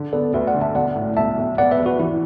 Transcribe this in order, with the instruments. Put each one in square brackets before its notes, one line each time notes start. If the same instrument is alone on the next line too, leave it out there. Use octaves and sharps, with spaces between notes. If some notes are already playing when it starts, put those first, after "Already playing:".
Already playing: [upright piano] D3
[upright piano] B3 [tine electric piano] A4 D5
[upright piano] D2 [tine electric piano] B4 E5
[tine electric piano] D5 F#5
[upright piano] D3
[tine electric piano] E5 A5
[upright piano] B1 [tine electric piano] D5 F#5
[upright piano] A2
[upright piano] B1 [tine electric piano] E5 A5
[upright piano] B1
[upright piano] B3 [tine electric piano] D5 F#5
[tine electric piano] B4 E5
[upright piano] E2
[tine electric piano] F#4 B4
[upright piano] E3 [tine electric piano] E4